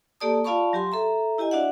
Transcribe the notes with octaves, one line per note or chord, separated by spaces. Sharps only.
A#3 G4 A4 D5 A5 D#6
F4 D5 F5 A5 B5 C#6
F#3 G4 G#5 C6
A4 E5 A#5
E4 G4 D#5 G#5
D4 F#4 D5 E5 F#5